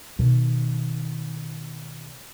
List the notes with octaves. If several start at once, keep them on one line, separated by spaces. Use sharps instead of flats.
B2 D#3